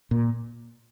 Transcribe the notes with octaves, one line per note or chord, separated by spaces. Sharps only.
A#2